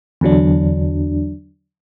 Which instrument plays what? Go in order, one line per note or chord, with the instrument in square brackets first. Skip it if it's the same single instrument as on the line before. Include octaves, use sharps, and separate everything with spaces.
[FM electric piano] E2 D3 F#3 D4